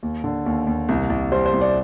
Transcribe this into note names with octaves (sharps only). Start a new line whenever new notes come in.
D#2
D3
D#2
D#2
C2
C2
G3 C5
C5
C2
D5